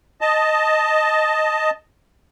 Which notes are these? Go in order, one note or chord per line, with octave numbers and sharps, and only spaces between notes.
D#5 A5